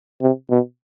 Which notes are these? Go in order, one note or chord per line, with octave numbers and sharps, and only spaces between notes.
C3
B2